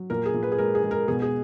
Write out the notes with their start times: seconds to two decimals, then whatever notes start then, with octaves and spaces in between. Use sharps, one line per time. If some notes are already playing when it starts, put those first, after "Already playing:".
Already playing: F#3
0.10 A#2 A#4
0.26 G#4
0.34 A#2
0.43 B4
0.52 G#4
0.58 G#3 A#4
0.75 G#4
0.83 G#3
0.91 A#4
1.08 B2 G#4
1.22 G#4